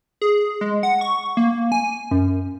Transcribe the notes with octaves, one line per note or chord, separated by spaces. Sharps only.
G#4
G#3
F#5
C#6
A#3
G#5
F#2